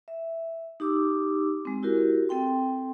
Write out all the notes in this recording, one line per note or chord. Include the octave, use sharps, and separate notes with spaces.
E5
D#4 G4 D6 E6
G#3 C4
E4 F#4 G4 A#4
C4 A4 G5 C6